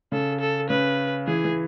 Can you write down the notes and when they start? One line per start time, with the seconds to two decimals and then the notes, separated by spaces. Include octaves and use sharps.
0.12 C#3 A4
0.40 A4
0.70 C#3 B4
1.27 E3 G#4
1.45 E3